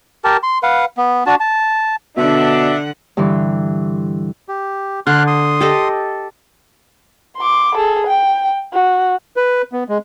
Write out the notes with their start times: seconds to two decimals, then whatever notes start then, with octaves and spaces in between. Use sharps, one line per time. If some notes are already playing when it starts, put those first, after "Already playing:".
0.24 G4 A#4 A5
0.43 C6
0.63 B4 F5 F#5
0.97 B3
1.26 D4 F#4 A5
1.40 A5
2.17 B2 D3 D4 E5 F#5
3.17 G2 D3 E3
4.48 G4
5.07 D3 C6 F6 F#6
5.27 C6 D#6
5.61 G4 A4 D#5
7.37 C6 D6
7.75 G#4 A4
8.07 G5
8.73 F#4
9.36 B4
9.72 B3
9.89 G#3